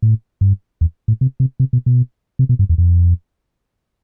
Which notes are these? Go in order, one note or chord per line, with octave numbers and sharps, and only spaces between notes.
A2
G2
E2
A2
C3
C3
C3
B2
B2
C3
B2
G2
E2
F2